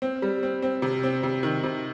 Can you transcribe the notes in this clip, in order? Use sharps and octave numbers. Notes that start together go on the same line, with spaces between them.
C4
G3
C4
C4
C3
C4
C3
D#3
C3